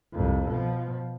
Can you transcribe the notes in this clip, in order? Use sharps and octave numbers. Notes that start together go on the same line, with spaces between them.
C2 F2
B2 F3